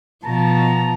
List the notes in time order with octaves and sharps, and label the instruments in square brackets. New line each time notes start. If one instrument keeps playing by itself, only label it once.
[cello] B2 [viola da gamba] F3 [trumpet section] A5 A#5